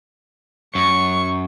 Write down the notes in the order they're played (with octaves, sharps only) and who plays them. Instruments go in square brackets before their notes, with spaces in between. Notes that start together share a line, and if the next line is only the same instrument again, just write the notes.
[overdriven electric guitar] F#2 [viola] C#6